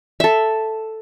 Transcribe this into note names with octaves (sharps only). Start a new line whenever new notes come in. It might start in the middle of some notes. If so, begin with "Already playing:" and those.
A4 E5